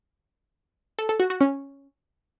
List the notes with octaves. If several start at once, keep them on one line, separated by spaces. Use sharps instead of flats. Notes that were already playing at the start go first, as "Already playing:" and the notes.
A4
A4
F#4
F#4
C#4